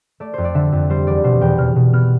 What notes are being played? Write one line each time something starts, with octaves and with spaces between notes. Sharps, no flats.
A3 D5
F2 C5
D5
D3 E5
F2
G3 C5
E2 D5
B2 C5
E2 G5
B2 F6
B2
B3 F6